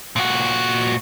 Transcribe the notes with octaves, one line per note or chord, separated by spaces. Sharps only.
A#2 F#4